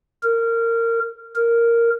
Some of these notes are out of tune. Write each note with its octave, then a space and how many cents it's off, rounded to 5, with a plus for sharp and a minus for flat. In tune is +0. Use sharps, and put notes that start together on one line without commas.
A#4 -20
A#4 -5